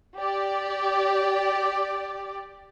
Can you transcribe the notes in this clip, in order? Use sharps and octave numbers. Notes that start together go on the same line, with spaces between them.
G4 D5